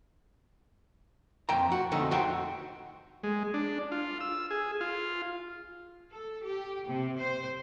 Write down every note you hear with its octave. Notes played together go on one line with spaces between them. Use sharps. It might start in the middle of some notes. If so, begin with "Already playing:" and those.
F2 G5 A#5
F#4
F2 D3 A3 D#4
F#4 C5 E5 F#5 G5
G#3
D4
F4
E6
G#4
F4
A4
G4
C3
C5